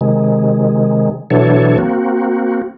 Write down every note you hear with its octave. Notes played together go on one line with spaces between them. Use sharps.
C3 D#3 G#3
B2 E3 F#3 D4 A4 C#5
A#3 C4 F#4